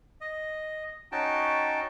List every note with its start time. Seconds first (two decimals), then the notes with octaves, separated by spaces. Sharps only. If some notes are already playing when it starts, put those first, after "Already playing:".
0.21 D#5
1.12 C#4 D#4 F#4 G5 A5